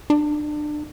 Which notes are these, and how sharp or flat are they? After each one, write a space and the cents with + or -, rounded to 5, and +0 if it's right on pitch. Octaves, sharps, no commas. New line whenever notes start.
D4 +30